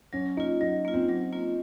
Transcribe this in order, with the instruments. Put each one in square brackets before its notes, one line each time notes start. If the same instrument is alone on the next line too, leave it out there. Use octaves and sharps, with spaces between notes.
[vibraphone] F#3 [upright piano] C#4
[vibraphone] A#3 F4 [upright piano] D#4
[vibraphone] F#3 [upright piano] D#4
[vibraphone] A#3 F4
[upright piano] C4
[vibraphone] F#3
A#3 F4